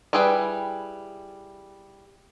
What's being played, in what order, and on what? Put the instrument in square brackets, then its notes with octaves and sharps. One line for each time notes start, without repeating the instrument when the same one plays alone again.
[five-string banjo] G3 E4 G#4 B4 G5